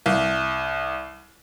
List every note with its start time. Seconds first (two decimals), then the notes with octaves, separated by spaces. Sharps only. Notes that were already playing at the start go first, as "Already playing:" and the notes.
0.06 C2